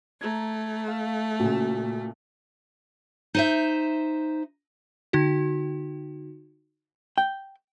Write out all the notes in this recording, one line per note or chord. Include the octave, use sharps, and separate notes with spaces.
A3 A#5 G#6
F5
A#2 C#3 F#4
D#4 C5 E5
D3 D#4 F#4
G5